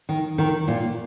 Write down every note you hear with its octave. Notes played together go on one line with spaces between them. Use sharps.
D#3
D#3
A#2